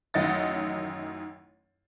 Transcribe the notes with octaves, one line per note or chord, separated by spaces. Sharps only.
A1 F#2 D#3 D#5 F#5 A6